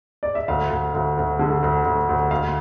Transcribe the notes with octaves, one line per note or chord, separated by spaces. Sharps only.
D5
E5
D2 F5
D2
D2
D2
D3
D2
D2
D2
D2 F5